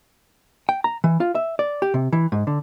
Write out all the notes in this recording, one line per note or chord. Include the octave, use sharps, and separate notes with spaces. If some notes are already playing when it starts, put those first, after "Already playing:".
G5
A#5
E3
F4
E5
D5
G4
C3
E3
G#2
D3